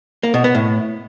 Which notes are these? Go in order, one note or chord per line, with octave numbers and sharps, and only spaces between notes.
A#3
B2
B3
A2